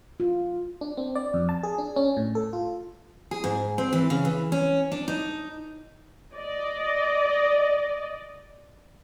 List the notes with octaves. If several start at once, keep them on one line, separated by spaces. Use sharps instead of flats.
F4
D4
C4
D5
F2
A5
G#4
D4
C#4
A2
A4
F4
G#4
G#2
C4
E3
C#3
E3
C#4
D4
D#4
D5 D#5